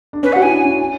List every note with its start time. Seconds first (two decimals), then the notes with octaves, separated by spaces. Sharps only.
0.13 D4
0.23 C#4 B4
0.32 F#5
0.36 F#4
0.42 E4 G#5
0.52 D4
0.65 C#4
0.75 D4